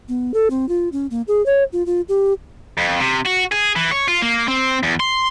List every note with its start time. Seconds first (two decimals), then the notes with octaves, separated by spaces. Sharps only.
0.09 B3
0.34 A4
0.51 C4
0.69 F4
0.92 C#4
1.11 A#3
1.28 G#4
1.46 C#5
1.73 F4
1.86 F4
2.09 G4
2.78 F2
3.00 C3
3.26 F#4
3.52 G#4
3.76 E3
3.91 C#5
4.08 F4
4.22 A#3
4.48 C4
4.83 E2
5.00 C6